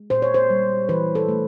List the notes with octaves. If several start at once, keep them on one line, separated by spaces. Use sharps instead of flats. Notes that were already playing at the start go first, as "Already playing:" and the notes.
Already playing: G#3
A#2 C5
C#5
C5
G3
E3 B4
A4
A3